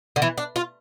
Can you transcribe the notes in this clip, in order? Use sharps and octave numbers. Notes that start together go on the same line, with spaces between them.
D3
E3
D4
F4